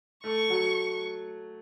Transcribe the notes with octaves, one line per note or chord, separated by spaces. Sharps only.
A3 C#6
F#3